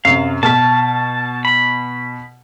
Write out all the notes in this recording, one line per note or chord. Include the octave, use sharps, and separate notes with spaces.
F#2 C3 F5
B2 A5 F6 B6
B5